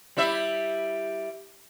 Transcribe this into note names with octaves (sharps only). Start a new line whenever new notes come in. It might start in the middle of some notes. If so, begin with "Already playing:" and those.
G3 E4 E5